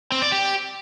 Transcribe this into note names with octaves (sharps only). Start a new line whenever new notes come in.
C4
D5
G4